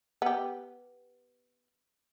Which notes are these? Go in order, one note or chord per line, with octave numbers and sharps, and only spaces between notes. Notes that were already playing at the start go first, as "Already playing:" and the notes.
B3 G4